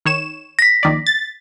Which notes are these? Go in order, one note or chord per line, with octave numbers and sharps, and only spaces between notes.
D#3 C#5 E7
A#6 B6
A#1 D#3 D5
A6